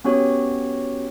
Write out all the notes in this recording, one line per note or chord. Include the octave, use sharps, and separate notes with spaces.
B3 C#4 F#4 G4 C#5